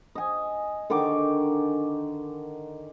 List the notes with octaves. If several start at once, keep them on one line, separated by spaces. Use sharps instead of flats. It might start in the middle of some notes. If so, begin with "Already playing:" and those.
D#5 G#5
D3 D#3 C#6 D6